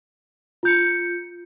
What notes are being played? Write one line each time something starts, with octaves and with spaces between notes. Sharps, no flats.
F4 G6 C#7